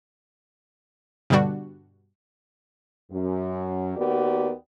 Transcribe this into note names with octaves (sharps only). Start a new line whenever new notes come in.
G2 B2 D3 G3 D4 F#4
F#2
D#2 B3 F#4 G4 A#4 D5